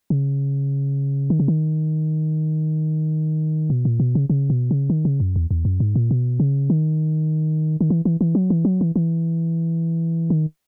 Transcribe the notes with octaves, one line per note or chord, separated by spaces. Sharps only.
C#3
D#3
C#3
D#3
B2
A#2
B2
C#3
C#3
B2
C#3
D#3
C#3
F#2
E2
E2
F#2
G#2
A#2
B2
C#3
D#3
D#3
E3
E3
E3
F#3
E3
F#3
E3
E3
D#3